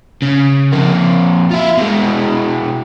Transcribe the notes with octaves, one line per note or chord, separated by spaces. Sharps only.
C#3
F2 A#3
E4 F4
B2 G#3